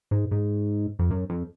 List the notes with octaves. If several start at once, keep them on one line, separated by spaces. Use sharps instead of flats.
G#2
G#2
F2
F#2
F2